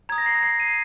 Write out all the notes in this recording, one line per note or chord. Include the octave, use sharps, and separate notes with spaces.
A#5 D#6 G#6
A#6
C7
A#6
C7
D#7